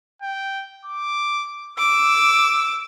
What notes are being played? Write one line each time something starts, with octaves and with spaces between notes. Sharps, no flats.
G5
D6
D6 E6